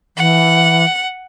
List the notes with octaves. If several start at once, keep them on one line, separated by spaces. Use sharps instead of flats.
E3 F#5